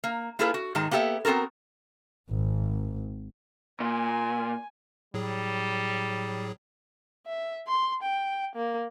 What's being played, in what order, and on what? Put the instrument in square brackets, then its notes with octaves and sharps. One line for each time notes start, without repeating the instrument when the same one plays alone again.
[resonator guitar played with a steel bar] A#3
A#3 E4 F4 G#4 A4 B4
F#4
G#2 D#3 G#3 A5
A#3 B3 G4 A4 E5
B3 C4 F#4 A4 A#4
[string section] G#1
[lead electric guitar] A#2 [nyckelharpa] G#5
[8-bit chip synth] A2 F#3 G#4 [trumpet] G3
[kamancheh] E5
C6
G5
A#3